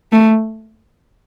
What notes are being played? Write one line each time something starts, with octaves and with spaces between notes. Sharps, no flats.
A3